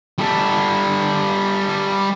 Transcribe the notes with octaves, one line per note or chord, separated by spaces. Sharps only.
G3 A4